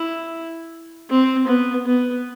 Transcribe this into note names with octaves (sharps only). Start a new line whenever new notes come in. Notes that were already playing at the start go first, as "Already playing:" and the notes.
Already playing: E4
C4
B3
B3